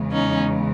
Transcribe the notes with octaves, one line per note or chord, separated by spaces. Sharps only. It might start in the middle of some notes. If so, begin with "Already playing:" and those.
Already playing: E2 C#3 E3 G#3
C#4 D#4